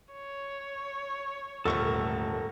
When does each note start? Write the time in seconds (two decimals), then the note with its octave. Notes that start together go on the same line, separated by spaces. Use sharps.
0.13 C#5
1.65 D#1 D2 G#2 A3 A4 A#4 C#6